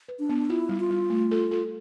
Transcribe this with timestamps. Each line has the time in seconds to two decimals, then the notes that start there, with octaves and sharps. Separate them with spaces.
0.08 B4
0.19 D4
0.29 B3
0.49 E4 F4
0.69 G3
0.80 F4
0.90 G3
1.10 A3
1.31 A4
1.51 A4